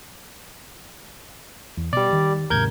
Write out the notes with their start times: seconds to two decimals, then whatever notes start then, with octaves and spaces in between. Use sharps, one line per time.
1.77 E2
1.93 B2 G3 D5
2.13 D#3
2.50 D#2 G#2 C3 A#4 G6 G#6